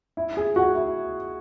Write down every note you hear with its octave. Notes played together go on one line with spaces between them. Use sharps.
E4
G#4
F#4
E4